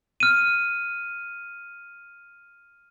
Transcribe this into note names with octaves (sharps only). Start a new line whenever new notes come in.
F6 D#7